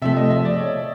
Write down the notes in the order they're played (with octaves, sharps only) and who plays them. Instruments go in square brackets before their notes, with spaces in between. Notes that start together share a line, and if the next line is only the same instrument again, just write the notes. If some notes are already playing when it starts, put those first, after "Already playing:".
[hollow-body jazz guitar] C3 F3 A3 [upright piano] E5
[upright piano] D#5
E5
D5
C#5